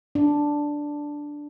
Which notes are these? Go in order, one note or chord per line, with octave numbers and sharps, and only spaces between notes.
D4